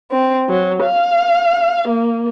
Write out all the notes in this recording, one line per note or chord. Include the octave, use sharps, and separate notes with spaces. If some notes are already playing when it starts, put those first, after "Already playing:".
C4
F#3
F5
A#3